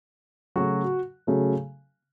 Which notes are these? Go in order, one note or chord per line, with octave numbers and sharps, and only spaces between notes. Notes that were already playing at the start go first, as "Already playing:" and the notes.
C#3 F#3 A3 F#4
C#3 F#3 A3